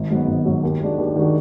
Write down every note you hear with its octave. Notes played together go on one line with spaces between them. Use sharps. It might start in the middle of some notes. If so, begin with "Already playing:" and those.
Already playing: G#1
G#2 F#3 B3
G#1
G#2 F#3 B3
D#2
D#3 G#3 D4 F#4
D#2
D#3 G#3 D4 F#4